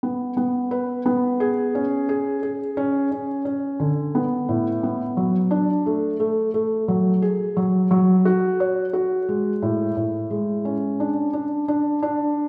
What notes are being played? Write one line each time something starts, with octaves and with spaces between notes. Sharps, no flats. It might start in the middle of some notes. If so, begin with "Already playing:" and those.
B3
B3
B4
B3
G#4
C#4
G#4
G#4
C#4
C#4
C#4
D3
B3
A2
B3
F#3
D4
A3
A3
A3
F#3
G#4
F#3
F#3
F#4
C#5
F#4
G#3
A2
A2
G#3
C#4
D4
D4
D4
D4